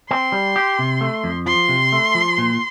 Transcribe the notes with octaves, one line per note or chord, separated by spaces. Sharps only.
C4 C6
G3
G4
C3
A3
F2
F3 C6
C3
A3
F3
A#2